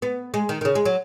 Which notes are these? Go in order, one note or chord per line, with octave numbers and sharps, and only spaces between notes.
B3
G#3
D#3
D#3
C#3
G#3
F#3